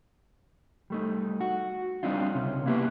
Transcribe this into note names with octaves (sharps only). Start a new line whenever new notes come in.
G3 A3 D#4
F#4
G3 C4 D4 D#4 F4
C#2 C3 C#4
A#3 B3 E4 G4 A4 B4